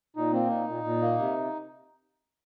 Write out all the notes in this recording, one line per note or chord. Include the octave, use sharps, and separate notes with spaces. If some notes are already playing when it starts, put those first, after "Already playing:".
A#2 D#4
A#3 C4
A#2 D#4
A#2
A#2
A#3
C3